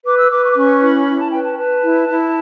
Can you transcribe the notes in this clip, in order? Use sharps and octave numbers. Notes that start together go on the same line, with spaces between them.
B4 D6
E6
B4 D6
C#6
D6
C#4 C#6
E4 B5
E4
A5
B4 G5
A5
B4 A5
E4
E4